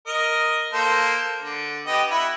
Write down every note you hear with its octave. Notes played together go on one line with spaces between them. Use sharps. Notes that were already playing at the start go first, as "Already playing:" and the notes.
A#4 D#5
A#3 A4 C5
D3
B3 G4 D#5
E4 F#5 B5